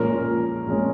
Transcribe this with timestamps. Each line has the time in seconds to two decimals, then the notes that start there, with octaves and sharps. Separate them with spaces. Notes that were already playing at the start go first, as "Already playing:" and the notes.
Already playing: A#2 F3 G#3 C#4 A#4
0.66 A#2 F3 G#3 C#4